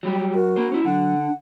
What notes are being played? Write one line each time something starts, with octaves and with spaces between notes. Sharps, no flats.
F#3 G3 G4
F#2 F#4 A#4
A#3 C5
C#4 E4
D3 F#3 F#5
D4